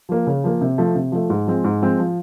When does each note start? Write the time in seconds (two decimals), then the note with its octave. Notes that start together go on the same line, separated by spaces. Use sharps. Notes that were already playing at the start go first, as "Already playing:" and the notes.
0.09 F3 A#3
0.27 C#3
0.44 F3 A#3
0.61 C3
0.78 F3 A3
0.95 C3
1.12 F3 A3
1.30 G#2
1.47 F3 G#3 C4
1.64 G#2
1.81 F3 G#3 C4
1.99 F3